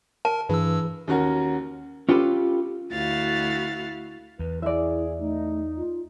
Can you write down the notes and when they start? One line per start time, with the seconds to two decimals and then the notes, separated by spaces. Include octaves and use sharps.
0.25 A#4 A5
0.49 G2 E3 G#4 B4 E6
1.08 D#2 C#4 F#4 A#4
2.09 C#4 F4 G4 A4 B4
2.91 D2 E4 F#4 F5 A6
4.39 E2 B4
4.62 E4 G#4 D5 E5
5.19 A3 D#4
5.77 F4